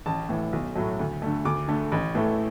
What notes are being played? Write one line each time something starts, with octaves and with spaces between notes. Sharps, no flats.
A1 A5
A2 E3
B1
A2 F#3 A3
D2
D3 A3
D2 D6
D3 A3
A1
A2 E3 A3